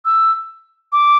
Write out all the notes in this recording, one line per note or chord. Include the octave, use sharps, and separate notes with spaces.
E6
D6